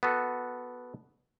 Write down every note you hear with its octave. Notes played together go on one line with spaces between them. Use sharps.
B3 F#4 A4